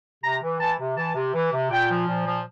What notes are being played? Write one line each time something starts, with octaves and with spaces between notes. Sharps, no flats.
C3 A#5
E3
E3 A5
C3
E3 A5
C3
E3
C3
A#2 G5
F3
A#2
F3